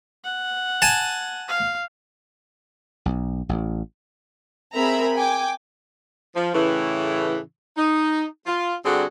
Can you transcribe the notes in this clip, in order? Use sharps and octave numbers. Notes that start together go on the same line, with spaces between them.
F#5
G#5 A5
F5
B1
A1
C4 G#4 A#4 E5 A#5 B5
G5 G#5 D6
F3
A2 C#3 E3
D#4
F4
G2 D3 G3 C4 F#4 G#4